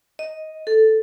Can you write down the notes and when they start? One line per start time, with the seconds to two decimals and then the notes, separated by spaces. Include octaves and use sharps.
0.19 D#5
0.67 A4